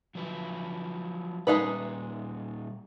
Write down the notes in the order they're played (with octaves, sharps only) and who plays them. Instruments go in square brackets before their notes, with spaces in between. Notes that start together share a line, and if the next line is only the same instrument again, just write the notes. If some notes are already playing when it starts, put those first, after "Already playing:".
[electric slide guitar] F3 F#3 B4
[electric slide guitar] A#2 G3 [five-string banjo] G#3 D#4 B4